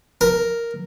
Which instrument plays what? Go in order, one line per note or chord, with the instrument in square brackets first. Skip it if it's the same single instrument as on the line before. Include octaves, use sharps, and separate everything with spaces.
[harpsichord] A#4